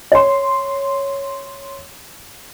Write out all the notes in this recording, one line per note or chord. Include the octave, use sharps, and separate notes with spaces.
C#5 C6